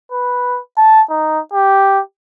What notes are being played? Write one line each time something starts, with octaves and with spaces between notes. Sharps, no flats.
B4
A5
D#4
G4